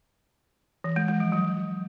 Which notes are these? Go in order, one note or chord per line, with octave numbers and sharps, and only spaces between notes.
E3
G#3
G#3
F3
F#3